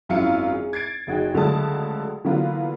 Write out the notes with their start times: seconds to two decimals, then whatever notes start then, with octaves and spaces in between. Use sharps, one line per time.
0.09 G#1 F#2 E4 F4 F5 C#7
0.52 G#4
0.73 G#6 A6 C7 D7
1.07 F#1 D#4 F#4 G#4 G5
1.34 C#2 D3 F#3 A3 A5 D#6
2.25 D3 E3 F#3 A#3 B3 F4